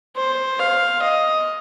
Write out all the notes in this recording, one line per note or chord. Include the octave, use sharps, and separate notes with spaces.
C5
F5
D#5